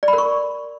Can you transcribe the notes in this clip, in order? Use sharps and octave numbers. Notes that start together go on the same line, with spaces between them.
D5
B5
A#4
C#6